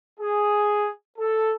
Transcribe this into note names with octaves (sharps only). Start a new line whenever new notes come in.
G#4
A4